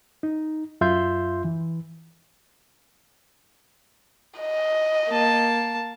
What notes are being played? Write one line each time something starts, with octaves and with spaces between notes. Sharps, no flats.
D#4
F#2 F4 E5 C6 G6
E3
D#5
A#3 A5